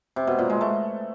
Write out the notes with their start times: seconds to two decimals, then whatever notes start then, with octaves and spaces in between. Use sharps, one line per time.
0.16 C3
0.27 B2
0.39 A#2
0.50 G#3
0.61 A3